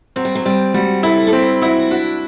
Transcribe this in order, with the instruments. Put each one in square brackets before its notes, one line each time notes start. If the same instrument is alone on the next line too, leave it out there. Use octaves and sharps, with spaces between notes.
[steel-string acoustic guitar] F#3 [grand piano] C4
[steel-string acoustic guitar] G3
F#3
[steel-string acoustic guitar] G3 [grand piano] C4
[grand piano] G3 [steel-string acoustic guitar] F#4
[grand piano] E4 [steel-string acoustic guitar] A4
[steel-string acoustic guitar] A4
[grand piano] C4 [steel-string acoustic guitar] G4
[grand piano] E4 [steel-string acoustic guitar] F#4
[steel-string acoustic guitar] D4 [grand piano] F#4